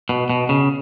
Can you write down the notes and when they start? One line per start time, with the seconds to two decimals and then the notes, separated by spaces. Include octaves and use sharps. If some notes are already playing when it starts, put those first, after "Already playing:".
0.09 B2
0.30 B2
0.49 C#3